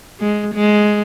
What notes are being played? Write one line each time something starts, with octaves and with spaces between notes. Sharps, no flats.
G#3
G#3